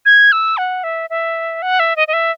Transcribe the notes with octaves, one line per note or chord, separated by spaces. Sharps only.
G#6
E6
F#5
E5
E5
F#5
E5
D#5
D#5
E5